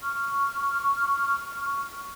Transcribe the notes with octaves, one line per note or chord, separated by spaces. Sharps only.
C#6 F6